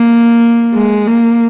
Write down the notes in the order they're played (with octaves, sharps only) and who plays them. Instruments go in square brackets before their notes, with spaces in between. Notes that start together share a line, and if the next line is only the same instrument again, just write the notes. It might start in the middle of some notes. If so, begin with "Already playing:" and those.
Already playing: [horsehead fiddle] A#3
G#3
A#3